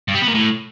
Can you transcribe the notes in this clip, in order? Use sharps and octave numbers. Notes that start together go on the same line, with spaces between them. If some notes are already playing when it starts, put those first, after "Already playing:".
G2
G3
B3
A#2
A2